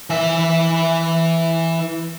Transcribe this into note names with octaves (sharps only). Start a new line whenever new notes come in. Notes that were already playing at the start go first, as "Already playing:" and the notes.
E3 E5